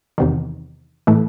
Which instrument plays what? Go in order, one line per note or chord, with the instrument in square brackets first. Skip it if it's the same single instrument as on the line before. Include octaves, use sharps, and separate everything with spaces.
[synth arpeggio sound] E2 C3 D#3
A2 E3 A3